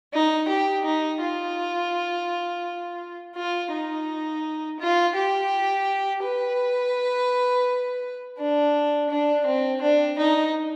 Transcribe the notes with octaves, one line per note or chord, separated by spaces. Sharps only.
D#4
G4
D#4
F4
F4
D#4
F4
G4
B4
D4
D4
C4
D4
D#4